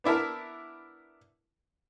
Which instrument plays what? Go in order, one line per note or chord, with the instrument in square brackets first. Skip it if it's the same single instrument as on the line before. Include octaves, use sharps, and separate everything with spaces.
[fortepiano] B3 D4 E4 A#4 A5